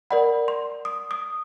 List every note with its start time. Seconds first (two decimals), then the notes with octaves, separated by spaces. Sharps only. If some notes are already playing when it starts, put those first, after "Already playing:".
0.11 A#4 D5 F#5 B5
0.48 C6
0.85 D#6
1.11 D#6